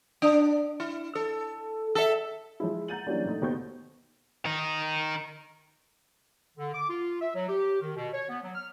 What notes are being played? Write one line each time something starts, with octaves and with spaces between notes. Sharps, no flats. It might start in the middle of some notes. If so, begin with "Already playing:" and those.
D4
E4
A4
A4 E5
F3 G#3 E4
F#5 A#5 G6 A6 D#7 F#7
E3 F#3 G3 A#3 C#4 D4
A#2 A3 D#4
D#2 B2 C5 C#6 G6
D#3 D#4
D3
D6
F4
E5
F#3
G4
D#3
B2
C#5
B3
F#3
F6